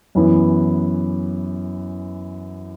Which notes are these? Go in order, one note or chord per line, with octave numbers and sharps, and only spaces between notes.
F#2 E3 B3 E4